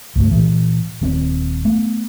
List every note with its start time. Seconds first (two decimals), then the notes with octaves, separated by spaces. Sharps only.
0.16 C#2 G2 A3
0.31 A#2 E3
1.01 D#1 D#2 C4
1.65 A3 B3